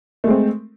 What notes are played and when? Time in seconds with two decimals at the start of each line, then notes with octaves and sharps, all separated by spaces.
0.24 A3
0.27 G#3
0.30 C4